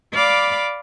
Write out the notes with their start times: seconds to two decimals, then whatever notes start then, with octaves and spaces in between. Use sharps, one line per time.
0.12 D5 F5 B5 D6